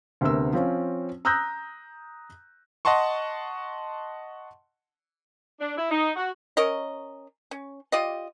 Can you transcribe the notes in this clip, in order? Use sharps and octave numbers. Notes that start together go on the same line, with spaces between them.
D2 C3 B3 A#4 E6
F3 C4 C#4
A#5 D#6 E6 F#6 G6 A#6
D#5 F#5 A5 C6 C#6
D4
E4
D#4
F#4
C#4 A#4 C#5 D#5
C#4
F4 G4 D5 D#5